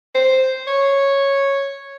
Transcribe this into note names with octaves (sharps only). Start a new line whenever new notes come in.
C5
C#5